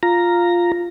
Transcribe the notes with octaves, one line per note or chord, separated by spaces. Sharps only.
F4 A#5